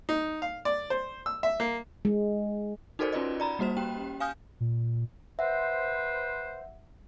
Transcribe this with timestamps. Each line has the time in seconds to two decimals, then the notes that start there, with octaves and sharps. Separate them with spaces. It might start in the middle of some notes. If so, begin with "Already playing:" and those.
0.09 D#4
0.42 F5
0.65 D5
0.90 C5
1.26 E6
1.43 E5
1.60 A#3
2.05 G#3
2.99 D#4 F#4 A4 A#4 C5 D5
3.13 C#4 D#4 F4 B4 D5 D#5
3.40 D5 A#5 B5
3.59 G3 A#3 F#4 C5 E7
3.77 C#4 G4 G5
4.20 F5 G#5 D#6 F6 G6
4.60 A#2
5.39 B4 C5 E5 F#5